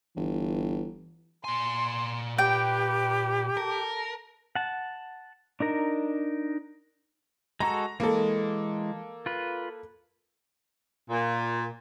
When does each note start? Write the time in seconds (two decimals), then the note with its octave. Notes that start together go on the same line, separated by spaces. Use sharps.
0.16 G1 E3
1.44 A#2 G#5 C6
2.38 G4 B4 G5
3.57 A4 A#4
4.55 F#5 A5
5.60 D4 D#4 A#4
7.60 G#3 F#4 A4 A#5
8.00 E3 G#3 A#3 A4
9.26 F4 B4
11.10 A#2